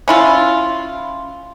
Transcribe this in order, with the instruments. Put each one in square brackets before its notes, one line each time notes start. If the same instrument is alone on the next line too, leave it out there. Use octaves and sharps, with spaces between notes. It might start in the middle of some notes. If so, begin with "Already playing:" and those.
[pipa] C#4 E4 F4